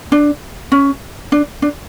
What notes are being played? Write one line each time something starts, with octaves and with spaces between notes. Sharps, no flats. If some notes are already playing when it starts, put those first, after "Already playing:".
D4
C#4
D4
D4